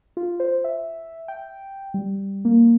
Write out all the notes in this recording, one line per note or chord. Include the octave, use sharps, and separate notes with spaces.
F4
C5
E5
G5
G3
A#3